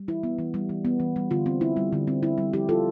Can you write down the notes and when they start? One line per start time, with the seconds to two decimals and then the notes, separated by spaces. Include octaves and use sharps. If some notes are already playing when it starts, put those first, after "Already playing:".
Already playing: G3
0.08 E3 E4
0.23 B3
0.39 E3
0.54 G3
0.69 E3
0.85 B3
1.00 E3
1.16 G3
1.31 D3 F4
1.46 C4
1.61 E4
1.77 G3
1.93 D3
2.07 C4
2.23 E4
2.38 G3
2.53 F3 E4 G4
2.69 E4 F4 A4